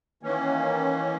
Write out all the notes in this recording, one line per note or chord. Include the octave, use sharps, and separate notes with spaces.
D#3 E3 A#3 C#4